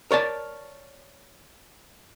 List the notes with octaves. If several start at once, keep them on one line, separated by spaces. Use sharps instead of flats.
A#4 C#5 D5 A5